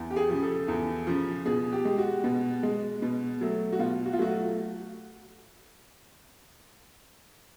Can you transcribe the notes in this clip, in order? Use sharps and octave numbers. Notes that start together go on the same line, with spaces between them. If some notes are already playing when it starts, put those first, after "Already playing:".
Already playing: E2
G4
G#4
C#3 F3
A4
E2
C#3 F3
B2 G#4
G4
G#3
F#4
B2
G#3
B2
F#3 A3
F#4
B2 F4
F#4
F4
F#3 A3 F#4